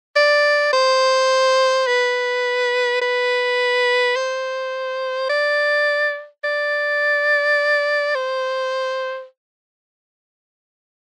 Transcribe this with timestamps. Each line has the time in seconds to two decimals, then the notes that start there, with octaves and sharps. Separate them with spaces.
0.16 D5
0.73 C5
1.87 B4
3.02 B4
4.16 C5
5.29 D5
6.44 D5
8.15 C5